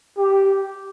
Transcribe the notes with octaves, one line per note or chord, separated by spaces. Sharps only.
G4